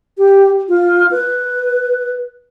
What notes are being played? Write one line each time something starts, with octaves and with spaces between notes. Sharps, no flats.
G4
F4
B4